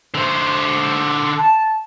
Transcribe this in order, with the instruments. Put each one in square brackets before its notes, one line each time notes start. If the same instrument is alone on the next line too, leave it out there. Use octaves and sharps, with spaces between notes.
[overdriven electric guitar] D3 C5
[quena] A5